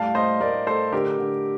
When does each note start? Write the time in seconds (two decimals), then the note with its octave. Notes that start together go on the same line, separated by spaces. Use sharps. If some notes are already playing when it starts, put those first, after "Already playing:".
Already playing: A2 G3 F5 A5
0.15 A2 C5 D#5
0.41 A2 A#4 D5
0.67 A3 A4 C5
0.92 D3 G4 A#4
1.19 D3